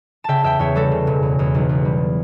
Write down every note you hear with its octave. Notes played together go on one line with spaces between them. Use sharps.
C#3 E5 G5 A5
E2 E5 G5
E2 C#5 E5
G3 F#4 A4
C#3
E1
E2
E2
B1
B1
G3